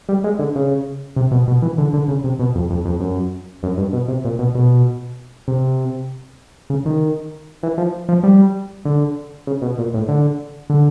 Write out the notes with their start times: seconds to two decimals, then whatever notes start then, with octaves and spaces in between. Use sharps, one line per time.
0.09 G3
0.24 G#3
0.39 D3
0.56 C#3
1.16 C3
1.32 B2
1.48 B2
1.62 E3
1.78 D3
1.93 D3
2.08 C#3
2.24 C3
2.39 B2
2.55 F2
2.70 F2
2.85 F2
3.00 F#2
3.63 F#2
3.78 G2
3.93 B2
4.08 C3
4.25 A#2
4.39 B2
4.55 B2
5.48 C3
6.70 C#3
6.86 D#3
7.63 E3
7.78 F3
8.09 F3
8.23 G3
8.85 D3
9.47 C#3
9.62 B2
9.78 A#2
9.94 A2
10.08 D3
10.70 D3